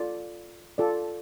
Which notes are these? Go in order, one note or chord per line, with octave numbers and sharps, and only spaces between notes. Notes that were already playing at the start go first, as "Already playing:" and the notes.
Already playing: F4 A4 D5
F4 A4 D5